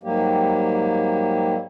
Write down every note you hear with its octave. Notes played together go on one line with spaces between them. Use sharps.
G#2 F#3 G3 A#3 G4